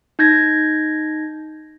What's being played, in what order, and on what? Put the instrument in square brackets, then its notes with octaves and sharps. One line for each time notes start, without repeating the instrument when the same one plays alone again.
[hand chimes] D#4 G6 G#6 A#6